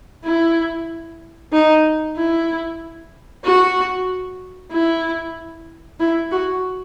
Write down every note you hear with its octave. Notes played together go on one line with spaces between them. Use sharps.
E4
D#4
E4
F#4
E4
E4
F#4